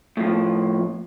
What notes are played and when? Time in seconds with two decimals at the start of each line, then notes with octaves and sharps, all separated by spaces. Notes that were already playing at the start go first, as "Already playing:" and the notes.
0.17 A2 F3